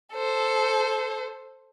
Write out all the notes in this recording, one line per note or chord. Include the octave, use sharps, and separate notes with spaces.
A4 C5